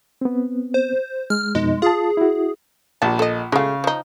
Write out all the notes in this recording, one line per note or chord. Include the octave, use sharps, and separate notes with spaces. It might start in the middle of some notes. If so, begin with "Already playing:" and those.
B3 C4
C5
G#3 F6
F2 B2 G#3 D#4
F4 G#4 A5
E4 F#4
A#1 G3 A5
A4 D#5
C#3 G#3 A3 F5
F3 D#4